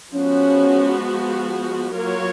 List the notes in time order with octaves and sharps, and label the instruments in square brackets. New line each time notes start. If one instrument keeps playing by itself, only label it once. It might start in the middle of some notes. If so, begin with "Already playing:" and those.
[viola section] F3 G#3 B3 F#4 [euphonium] C#4
[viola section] F#3 A#3 F4 A#4 C#5